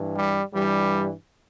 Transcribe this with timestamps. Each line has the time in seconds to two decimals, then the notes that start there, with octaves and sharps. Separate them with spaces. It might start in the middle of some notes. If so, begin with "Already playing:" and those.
Already playing: G2 E3
0.17 G3
0.54 G2 E3 G3